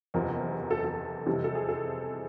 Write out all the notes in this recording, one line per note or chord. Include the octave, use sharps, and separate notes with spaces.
F#1 E2 C3 F3 A#4
A4
A4
F2 C3 E3 G3
A4
G#4
A4